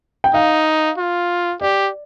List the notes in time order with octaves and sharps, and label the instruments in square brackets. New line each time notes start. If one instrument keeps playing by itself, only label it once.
[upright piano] G5
[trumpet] D#4 [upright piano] F5
[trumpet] F4
[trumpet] G4 [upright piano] D5